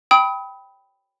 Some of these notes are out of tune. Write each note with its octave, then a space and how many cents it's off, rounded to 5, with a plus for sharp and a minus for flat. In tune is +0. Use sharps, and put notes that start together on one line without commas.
G5 +0 B5 +0 D#6 +40